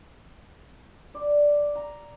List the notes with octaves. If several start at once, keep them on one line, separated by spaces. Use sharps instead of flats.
D5
A#5